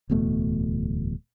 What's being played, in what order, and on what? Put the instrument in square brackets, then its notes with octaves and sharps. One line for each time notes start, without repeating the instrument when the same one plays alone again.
[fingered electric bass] D1 E2 B2 A3